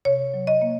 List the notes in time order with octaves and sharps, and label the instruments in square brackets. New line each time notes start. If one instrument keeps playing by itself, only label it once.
[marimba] C3 C#5
F#3
D#5
A#3